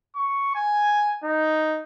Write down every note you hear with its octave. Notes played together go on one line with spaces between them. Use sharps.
C#6
G#5
D#4